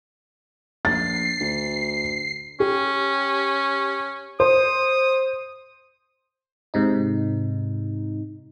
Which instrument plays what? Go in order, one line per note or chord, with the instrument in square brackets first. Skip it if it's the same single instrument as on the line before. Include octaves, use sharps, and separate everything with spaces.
[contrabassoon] A#1 [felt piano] A6 [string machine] C7
[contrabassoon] D2
[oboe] C#4 [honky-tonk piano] G4
[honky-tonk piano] C5 [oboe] D#6
[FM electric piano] G#2 C3 D#4